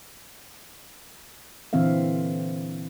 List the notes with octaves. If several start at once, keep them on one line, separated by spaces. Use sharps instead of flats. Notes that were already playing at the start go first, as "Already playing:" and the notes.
A#2 D3 E3 C4 E5 F5